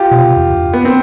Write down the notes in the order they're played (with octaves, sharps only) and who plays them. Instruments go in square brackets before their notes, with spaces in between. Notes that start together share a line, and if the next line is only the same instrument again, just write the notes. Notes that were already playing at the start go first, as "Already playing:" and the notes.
Already playing: [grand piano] F4 G4
[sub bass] B2
C3
E2
F2
[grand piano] B3
C4